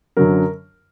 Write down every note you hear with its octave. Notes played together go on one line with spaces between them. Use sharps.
F#2 D3 F#3 A#4